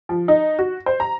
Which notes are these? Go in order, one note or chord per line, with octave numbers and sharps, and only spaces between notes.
F3
D#4
F#4
C5
A#5